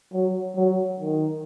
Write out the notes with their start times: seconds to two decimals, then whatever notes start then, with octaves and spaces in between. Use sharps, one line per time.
0.13 F#3
0.57 F#3
1.00 D#3